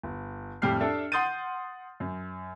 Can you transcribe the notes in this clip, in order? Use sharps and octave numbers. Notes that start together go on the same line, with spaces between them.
G1
F2 A2 G3 G4 F6 C7
D4 G4 A4 E5
F#5 C6 D#6 G6 A6 D#7
F#2